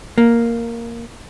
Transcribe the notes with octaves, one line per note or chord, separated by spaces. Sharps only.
A#3